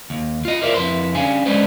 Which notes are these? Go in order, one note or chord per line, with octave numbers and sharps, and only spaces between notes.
D#2
F4 D#5
F4 A#4 C5 D5 E5 F5
F2 E4 B4 C6
G3 C#4 D4 F5 G#5
G#3 C#4 D4 B4 C5 D5